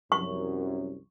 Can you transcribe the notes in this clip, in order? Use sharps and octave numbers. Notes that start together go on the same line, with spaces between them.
C2 F#2 C#6